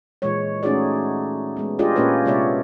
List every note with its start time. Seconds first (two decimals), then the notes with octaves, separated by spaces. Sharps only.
0.22 A#2 E3 G#3 C#5
0.63 A3 C#4 D#4 F#4 G#4 D5
1.57 G#3 B3
1.79 D4 F4 G4 G#4 D5 D#5
1.96 A#2 A#3 C#4 G4 B4 C#5
2.25 C3 G#3 B3 C#5 D5 E5